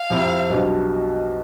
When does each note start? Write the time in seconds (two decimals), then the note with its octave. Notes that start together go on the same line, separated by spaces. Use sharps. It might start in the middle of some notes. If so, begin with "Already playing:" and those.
Already playing: F5
0.10 F2 C3 F3 C4 E4
0.50 B1 B2 G3 D4